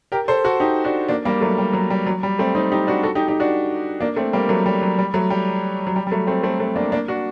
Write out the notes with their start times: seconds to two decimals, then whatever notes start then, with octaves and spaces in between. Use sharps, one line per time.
0.12 G4 A#4
0.28 A4 C5
0.45 F#4 A4
0.60 D#4 G4
0.85 D4 F#4
1.08 A#3 D4
1.25 G3 A#3
1.41 F#3 A3
1.58 G3
1.73 F#3
1.90 G3
2.06 F#3
2.23 G3
2.39 A3 C4
2.55 C4 D#4
2.71 D#4 G4
2.87 D4 F#4
3.03 F#4 A4
3.15 D#4 G4
3.28 D#4 G4
3.40 D4 F#4
4.01 A#3 D4
4.16 A3 C4
4.33 G3 A#3
4.49 F#3 A3
4.66 G3
4.82 F#3
4.99 G3
5.14 F#3 A3
5.30 G3
5.87 F#3
5.96 G3
6.07 G3
6.11 F#3 A3
6.27 A3 C4
6.43 A3 C4
6.59 A3 C4
6.76 A#3 D4
6.92 A#3 D4
7.08 D4 F#4